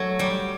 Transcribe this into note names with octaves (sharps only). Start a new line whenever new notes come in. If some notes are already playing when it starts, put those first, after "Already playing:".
Already playing: F#3 A3
G3